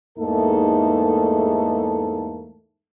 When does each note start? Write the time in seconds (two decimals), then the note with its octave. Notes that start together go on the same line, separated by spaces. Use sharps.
0.18 E2 G#2 A3 A#3 D#4 A4